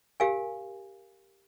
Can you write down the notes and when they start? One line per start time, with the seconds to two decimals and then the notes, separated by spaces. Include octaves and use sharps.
0.20 G4 A#4 F5 G#5